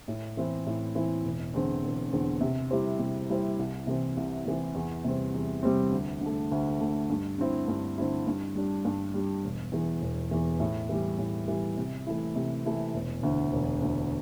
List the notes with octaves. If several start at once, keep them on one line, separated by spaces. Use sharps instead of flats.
A2
E3 C4 E4
A2
E3 C4 E4
E1
E2 D3 C4
E1
E2 D3 C4
C3
G3 E4 G4 C5
C3
G3 E4 G4 C5
C2
C3 E3 C4
C2
C3 E3 C4
E2
C3 G3 C4
E2
C3 G3 C4
D2
D3 A3
D2
D3 A3
G2
D3 C4 E4
G2
D3 C4 E4
G2
G3 D4
G2
G3 D4
E1
E2 E3
E1
E2 E3
A2
E3 G3
A2
E3 G3
C3
E3 A3 E4
C3
E3 A3 E4
E1
D2 D3
E1
D2 D3